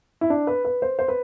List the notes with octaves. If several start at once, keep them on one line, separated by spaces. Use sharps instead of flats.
E4
D4
B4
B4
C5
C5
B4